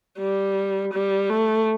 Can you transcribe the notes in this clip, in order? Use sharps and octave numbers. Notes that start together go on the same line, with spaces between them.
G3
G3
A3